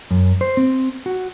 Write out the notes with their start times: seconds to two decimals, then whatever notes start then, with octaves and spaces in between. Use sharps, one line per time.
0.11 F#2
0.41 C5
0.57 C4
1.06 F#4